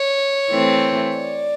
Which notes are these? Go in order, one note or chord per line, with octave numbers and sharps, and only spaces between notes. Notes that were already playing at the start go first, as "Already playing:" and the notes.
Already playing: C#5
E3 A3 C4
D5